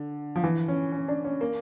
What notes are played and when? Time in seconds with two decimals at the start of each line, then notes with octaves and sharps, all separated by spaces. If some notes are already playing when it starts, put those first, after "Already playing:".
Already playing: D3
0.36 F3
0.44 E3
0.68 C#4
0.92 C#4
1.08 D4
1.24 C#4
1.41 A#3